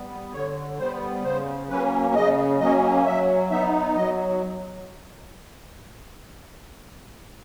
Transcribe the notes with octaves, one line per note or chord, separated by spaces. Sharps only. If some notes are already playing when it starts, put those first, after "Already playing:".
Already playing: G3 B3
D3 C#5
G3 B3 C5
C#3 C5
F#3 A#3 C#4 B4
C#3 D#5
F#3 A#3 C#4 D#5
F#3 E5
B3 D#4 E5
F#3 D#5